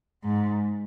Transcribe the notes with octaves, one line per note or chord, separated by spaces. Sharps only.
G#2